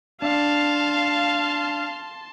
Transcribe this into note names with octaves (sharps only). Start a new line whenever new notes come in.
D4 F5 A5 C6